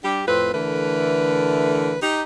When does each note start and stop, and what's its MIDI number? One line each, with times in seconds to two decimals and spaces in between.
0.04 0.22 55
0.04 0.22 62
0.04 0.22 67
0.28 0.49 41
0.28 0.49 45
0.28 0.49 60
0.28 0.49 65
0.28 0.49 71
0.54 1.97 50
0.54 1.97 52
0.54 1.97 57
0.54 1.97 70
0.54 1.97 71
2.02 2.23 63
2.02 2.23 67